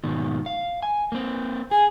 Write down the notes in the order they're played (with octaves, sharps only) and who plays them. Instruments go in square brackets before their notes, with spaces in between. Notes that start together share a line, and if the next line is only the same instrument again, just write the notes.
[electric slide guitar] G#2 B2 D#3
F5
G#5
A#3 C4
[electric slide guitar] G#4 [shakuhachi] G#5